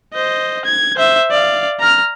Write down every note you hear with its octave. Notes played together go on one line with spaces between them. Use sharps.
C5 D#5
G#6
C5 E5
D5 F5
A#5 F6